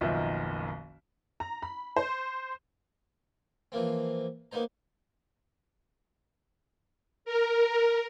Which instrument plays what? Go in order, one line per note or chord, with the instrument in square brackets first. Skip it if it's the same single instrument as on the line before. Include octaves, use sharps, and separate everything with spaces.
[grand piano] F#1 B1 D#3 F3 B3 E5
[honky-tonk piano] A#5
B5
C5
[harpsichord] E3 F3 A#3 C4
A#3 B3 D#4 C5 A#5
[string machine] A#4